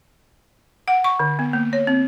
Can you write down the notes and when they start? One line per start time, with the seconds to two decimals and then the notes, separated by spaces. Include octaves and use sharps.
0.88 F#5
1.04 C#6
1.19 D3
1.39 B3
1.53 A#3
1.73 C#5
1.87 C4